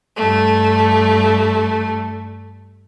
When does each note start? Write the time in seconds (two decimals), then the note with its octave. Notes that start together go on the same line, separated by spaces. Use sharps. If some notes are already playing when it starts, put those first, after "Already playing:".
0.17 G2 A3